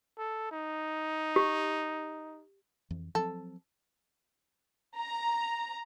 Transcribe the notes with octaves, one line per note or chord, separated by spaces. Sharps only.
A4
D#4
G4
F2 E3
F3 F#3 C4 A4
A#5